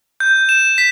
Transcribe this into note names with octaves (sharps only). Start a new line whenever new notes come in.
G6
E7
B6